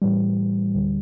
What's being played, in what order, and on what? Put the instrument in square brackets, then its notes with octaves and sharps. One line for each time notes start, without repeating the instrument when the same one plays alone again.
[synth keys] A2 E3 G3
D2 D3 G3